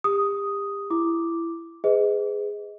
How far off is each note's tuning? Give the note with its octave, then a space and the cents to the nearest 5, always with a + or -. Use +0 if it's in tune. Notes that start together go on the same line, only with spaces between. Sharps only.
G4 +35 D#6 +0
E4 +20 D6 +0
G#4 +0 B4 +40 D#5 +20